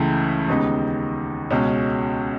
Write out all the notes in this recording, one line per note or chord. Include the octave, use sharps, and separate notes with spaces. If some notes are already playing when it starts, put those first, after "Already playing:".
Already playing: C#2 C#3 E3 A3
D#2 C#3 G#3 B3 D#4
C#2 B2 G#3 C#4